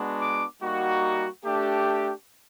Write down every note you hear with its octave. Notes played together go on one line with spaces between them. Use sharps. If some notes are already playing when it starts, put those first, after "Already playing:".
Already playing: G#3 B3 D4 F#4
D6
G3 A#3 D#4 F#4
A3 D4 G4